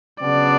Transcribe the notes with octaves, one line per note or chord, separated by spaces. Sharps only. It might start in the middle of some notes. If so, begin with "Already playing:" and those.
C#3 F#3 B3 D4 D5